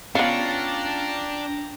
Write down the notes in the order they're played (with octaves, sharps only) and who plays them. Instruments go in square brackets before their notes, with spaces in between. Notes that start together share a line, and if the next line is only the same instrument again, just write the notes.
[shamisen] B3 F5 [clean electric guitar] C#4 F4 C#5 [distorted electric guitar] D4 [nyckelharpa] G5 A#5